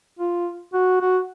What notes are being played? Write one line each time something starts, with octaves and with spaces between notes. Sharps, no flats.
F4
F#4
F#4